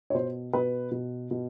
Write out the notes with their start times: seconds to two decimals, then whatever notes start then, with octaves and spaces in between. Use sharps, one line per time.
0.10 C#5
0.15 B2 C5
0.53 B2 B4
0.91 B2
1.31 B2